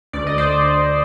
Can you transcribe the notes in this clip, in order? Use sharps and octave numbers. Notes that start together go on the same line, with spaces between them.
D2 D5
D#5
C5 D5